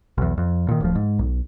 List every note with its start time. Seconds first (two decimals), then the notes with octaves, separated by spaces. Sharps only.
0.18 B1 E2
0.38 F2
0.68 A#2 D#3
0.81 D1 D2 F3
0.95 G#2
1.19 B1